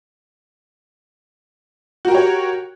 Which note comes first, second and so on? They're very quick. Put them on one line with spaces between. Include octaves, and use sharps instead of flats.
F#4 A#4 G4 C#5